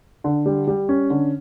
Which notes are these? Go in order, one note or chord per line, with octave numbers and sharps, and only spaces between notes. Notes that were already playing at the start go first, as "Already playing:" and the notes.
D3
G3
G3
C#4
D3